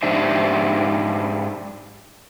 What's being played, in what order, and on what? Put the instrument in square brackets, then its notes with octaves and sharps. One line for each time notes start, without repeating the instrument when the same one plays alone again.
[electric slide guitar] G#2 D4 D#4 G4 C5 E5